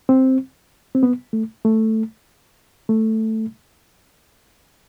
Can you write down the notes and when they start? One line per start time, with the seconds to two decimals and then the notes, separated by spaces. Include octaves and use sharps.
0.09 C4
0.95 C4
1.03 B3
1.33 A3
1.65 A3
2.89 A3